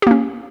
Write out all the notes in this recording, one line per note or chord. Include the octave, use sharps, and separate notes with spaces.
A#3 C#4 G4